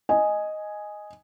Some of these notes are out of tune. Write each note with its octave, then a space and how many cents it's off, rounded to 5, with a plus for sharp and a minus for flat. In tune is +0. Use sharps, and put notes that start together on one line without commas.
D#5 +0 G#5 +0